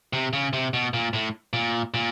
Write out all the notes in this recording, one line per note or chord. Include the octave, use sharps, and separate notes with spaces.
C3
C#3
C3
B2
A#2
A2
A#2
A#2